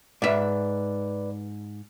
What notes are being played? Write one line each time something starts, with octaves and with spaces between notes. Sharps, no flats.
G#2 B4 D5 E5